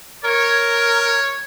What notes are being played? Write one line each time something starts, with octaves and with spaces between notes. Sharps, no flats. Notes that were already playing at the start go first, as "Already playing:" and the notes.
A#4 C#5